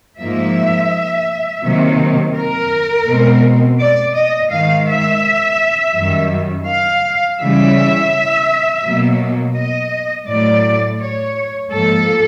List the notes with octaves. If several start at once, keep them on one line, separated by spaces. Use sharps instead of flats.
G#2 F3 A#3 E5
C3 D#3 F#3 A#3
A#4
B2 G#3 C4
D5
D#5
G#2 D#3 G#3 F5
E5
F#2 D#3 G3
F5
C#3 E3 G3 E5
B2 F#3 A#3
D#5
A2 F#3 A3 D5
C#5
G#2 F3 A#3 A4